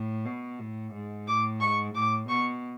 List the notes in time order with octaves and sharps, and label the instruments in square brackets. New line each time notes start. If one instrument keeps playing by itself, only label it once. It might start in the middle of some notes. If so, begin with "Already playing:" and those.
Already playing: [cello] A2
B2
A2
G#2
[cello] A2 [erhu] D6
[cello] G#2 [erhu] C#6
[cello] A2 [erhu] D6
[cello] B2 [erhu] C#6